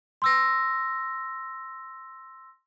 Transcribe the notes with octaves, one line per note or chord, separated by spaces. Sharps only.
C6 E6 A#6